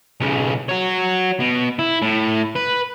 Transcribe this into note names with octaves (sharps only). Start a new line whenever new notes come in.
B1 C#3
F#4 C#5
B2
E4
A2
B4